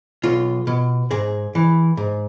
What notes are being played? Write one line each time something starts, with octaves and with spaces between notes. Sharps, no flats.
B1 F4
B2
G#2 G#4
E3
G#2